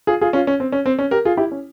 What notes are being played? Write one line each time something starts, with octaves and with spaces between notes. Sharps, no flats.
F4 G#4
F4 G#4
C#4 F4
C#4
C4
C#4
C4
C#4
G4 A#4
F4 G#4
E4 G4
C#4